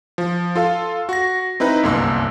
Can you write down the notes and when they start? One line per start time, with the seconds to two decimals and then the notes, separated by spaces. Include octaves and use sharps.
0.18 F3
0.55 F4 A4 F5
1.09 F#4 A#6
1.60 C4 D#4 E4 B4
1.83 G1 C2 F#2 A#3 C6 E6